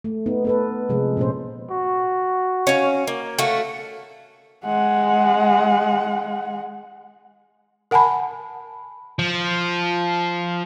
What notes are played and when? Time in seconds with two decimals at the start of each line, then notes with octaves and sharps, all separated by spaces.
0.04 A3
0.26 B3 D#4
0.45 B3 A4 B4
0.89 C3 F3 G#3
1.17 A#2 C#4 C5
1.71 F#4
2.67 C#4 F5
3.07 A#3
3.39 A3 F#4 F5
4.65 G#3 F#5
7.91 A#4 F#5 G#5 A5 B5
9.19 F3